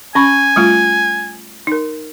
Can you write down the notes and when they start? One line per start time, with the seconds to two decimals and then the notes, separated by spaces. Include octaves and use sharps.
0.15 C#4 G#5 B5 C#6
0.56 G3 A3 F4
1.67 D#4 A#4